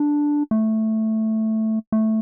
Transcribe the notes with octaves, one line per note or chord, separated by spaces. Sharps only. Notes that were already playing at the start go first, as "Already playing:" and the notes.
Already playing: D4
A3
A3